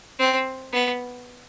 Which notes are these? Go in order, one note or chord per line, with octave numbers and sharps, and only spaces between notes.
C4
B3